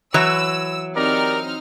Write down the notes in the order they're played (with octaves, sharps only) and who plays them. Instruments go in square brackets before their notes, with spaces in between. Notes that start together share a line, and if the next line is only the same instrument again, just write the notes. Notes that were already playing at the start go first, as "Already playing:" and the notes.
[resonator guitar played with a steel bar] E3 F#3 C#5 [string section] E6
[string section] C4 D#4 F6 [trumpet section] G4 A#4 D5